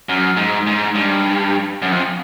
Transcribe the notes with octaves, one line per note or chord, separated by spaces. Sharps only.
F#2
G#2
G#2
G2
F#2
F2